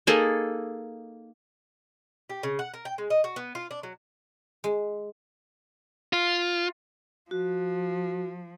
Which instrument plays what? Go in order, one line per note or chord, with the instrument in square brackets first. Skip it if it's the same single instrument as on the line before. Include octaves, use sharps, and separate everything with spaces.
[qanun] A#3 D#4 G#4 A4
[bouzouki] G4
C#3
F#5
A#4
G5
G#3
D#5
F#4
B3
F4
D4
F#3
[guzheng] G#3
[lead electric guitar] F4
[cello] F3 [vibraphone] F#4